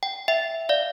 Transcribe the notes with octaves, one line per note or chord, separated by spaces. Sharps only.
G5
E5 G5
D5 F5